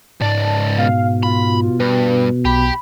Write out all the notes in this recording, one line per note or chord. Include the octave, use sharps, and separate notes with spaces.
C#2 G#2 D5 A5
B2 F5
F4 B5
G2 B4
B1 G4 B5